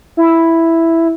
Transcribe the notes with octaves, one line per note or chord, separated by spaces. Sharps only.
E4